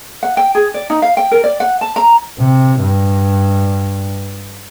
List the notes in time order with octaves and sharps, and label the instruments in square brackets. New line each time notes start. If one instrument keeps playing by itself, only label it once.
[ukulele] F#5
G5
G#4
D5
D#4
F5
G5
A#4
D5
F#5
A5
A#5
[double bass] C3
G2